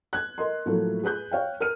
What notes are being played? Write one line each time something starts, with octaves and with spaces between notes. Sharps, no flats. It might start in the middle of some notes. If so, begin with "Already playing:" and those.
F#6 G#6
A#4 D#5 C6
A2 F3 F#3 A3 A#3
G#4 B4 F#6 G6
C#5 F5 G5
A#4 F6 D#7